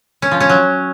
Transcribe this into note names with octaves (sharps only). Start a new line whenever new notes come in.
C#4
F3
C#4
F#3